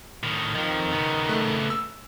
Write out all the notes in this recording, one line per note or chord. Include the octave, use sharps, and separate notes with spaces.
A2 D#3
F2 D#3 F3
C#3 B3
A3 F#6
E6